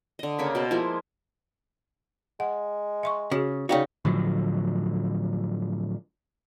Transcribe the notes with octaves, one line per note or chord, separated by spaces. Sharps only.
D3 D#5
C#3 A#3 C#5 B5
B2 C5 D5
F3 G#3 A#3 E4
G#3 F#5
E5 C6 C#6
C#3 F#4 G#4
C#3 D#4 F#4 D5 F5 G5
A2 D3 F3 F#3